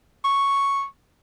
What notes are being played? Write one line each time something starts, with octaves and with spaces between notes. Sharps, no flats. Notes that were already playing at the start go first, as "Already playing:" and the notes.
C#6